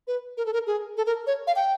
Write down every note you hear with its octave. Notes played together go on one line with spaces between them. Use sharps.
B4
A#4
A4
A#4
G#4
A4
A#4
C#5
F5
G5